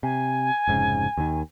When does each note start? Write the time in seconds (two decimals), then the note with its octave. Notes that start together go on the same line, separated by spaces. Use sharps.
0.03 C3 G#5
0.67 F1 G#2 C#3
1.17 D#2 D#3